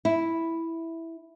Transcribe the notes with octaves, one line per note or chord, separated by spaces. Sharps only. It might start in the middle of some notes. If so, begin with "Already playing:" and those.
E4